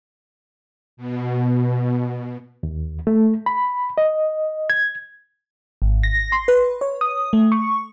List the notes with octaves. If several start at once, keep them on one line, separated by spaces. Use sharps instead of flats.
B2
D#2
A3
B5
D#5
G#6
G#1
A#6
C6
B4
C#5
D#6
A3
C#6